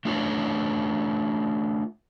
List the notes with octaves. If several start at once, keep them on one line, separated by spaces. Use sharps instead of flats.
A3 D4 F4 A#4 C#5